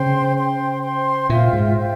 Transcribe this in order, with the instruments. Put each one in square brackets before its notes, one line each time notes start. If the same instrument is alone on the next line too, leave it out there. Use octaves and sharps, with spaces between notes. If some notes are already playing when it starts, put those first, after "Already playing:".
Already playing: [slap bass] C#3 [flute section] C5 G5 C6
[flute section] C5 G5 C6
C5 G5 C6
[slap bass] A#2 [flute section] F4 C5 E5 G5
[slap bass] G#2
[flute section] F4 C5 E5 G5